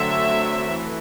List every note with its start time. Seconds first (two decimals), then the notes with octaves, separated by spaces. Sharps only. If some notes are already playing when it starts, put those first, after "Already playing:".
Already playing: D3 F#3 A3 C4 E5
0.68 E3 A3